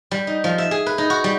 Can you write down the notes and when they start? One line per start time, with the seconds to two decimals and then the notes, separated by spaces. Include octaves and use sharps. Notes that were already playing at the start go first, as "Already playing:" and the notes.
0.11 G3
0.27 D#4
0.44 F3
0.58 E5
0.71 G#4
0.86 B4
0.98 D#4
1.10 F#4
1.24 G3